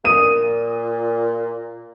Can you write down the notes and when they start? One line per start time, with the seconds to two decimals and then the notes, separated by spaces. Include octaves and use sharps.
0.04 A#2 D#6 D#7